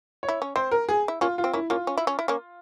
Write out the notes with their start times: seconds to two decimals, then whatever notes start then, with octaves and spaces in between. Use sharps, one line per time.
0.23 C#5
0.29 E4
0.42 C#4
0.56 C4 C5
0.71 A#4
0.89 G#4
1.08 E4
1.21 A#3 C#4 F4
1.38 F4
1.44 C4
1.53 A#3 C#4 E4
1.70 A#3 C#4 F4
1.87 C#4
1.97 E4
2.07 C#4
2.19 E4
2.28 A#3 C#4